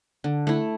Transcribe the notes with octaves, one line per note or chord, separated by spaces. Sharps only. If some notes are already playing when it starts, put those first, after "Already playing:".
D3
A3 E4